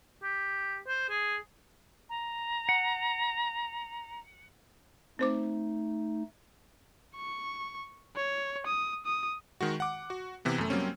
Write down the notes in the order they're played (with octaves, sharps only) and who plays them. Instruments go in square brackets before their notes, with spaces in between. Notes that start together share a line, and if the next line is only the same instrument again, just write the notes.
[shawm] G4
C5
G#4
[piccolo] A#5
[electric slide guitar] F#5
[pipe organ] A3 D#4 [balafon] C4 C5 D6
[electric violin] C#6
C#5
D#6
D#6
[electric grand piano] D#3 G#3 F#4
F#5 D6
F#4
C3 E3 B3
F#2 A3
F#3 G3 A#3 C4 C#4